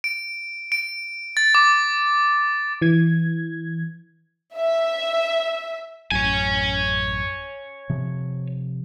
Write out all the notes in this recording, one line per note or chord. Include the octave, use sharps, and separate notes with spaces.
D7
D7
A6
D6
E3 G#6
E5
A1 F#2 C#5 G#5
C3 F3